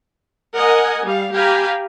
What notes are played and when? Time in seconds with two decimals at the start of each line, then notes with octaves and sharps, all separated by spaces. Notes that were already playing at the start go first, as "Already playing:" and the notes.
0.54 A#4 D#5 F#5 G#5
1.03 G3 F5
1.34 G4 F5 G5 G#5 A#5 B5